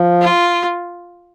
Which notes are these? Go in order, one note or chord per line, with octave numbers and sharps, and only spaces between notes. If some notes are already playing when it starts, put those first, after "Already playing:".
Already playing: F3
F4